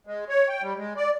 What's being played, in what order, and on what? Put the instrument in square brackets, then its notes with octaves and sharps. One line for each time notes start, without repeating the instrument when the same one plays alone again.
[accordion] G#3
C#5
G5
G3
G#3
D5